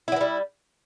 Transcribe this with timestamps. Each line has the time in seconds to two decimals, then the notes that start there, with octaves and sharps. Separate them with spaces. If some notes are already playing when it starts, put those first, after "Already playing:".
0.08 E4
0.12 F#3
0.16 E3
0.21 G3